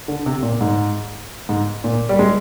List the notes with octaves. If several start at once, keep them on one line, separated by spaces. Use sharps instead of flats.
D3
C3
A#2
G#2
G#2
A#2
G3
G#3